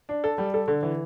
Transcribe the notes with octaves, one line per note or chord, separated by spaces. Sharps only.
D4
A4
G3
A4
D3
E3